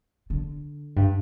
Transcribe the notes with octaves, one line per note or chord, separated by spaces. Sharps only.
D3
G2